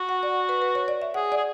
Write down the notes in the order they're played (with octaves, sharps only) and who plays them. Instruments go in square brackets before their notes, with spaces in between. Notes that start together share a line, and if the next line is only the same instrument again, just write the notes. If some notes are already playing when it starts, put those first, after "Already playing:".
Already playing: [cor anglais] F#4
[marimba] F#5
D5
B4
B4
C#5
D5
E5
[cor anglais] G#4 [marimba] F#5
[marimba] D5
[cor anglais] G#4